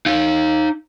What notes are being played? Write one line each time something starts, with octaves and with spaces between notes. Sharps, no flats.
D#4 F5